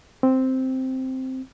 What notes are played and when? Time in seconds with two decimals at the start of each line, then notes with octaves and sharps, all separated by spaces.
0.23 C4